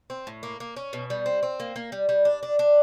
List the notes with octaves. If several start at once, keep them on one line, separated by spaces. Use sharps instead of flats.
C4
A2
A#3
A#3
C#4
B2
G3
C4
C4
A#3
A#3
G3
G3
D4
D4
D4